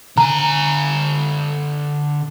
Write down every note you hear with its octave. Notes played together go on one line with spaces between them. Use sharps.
D3 G#5 A#5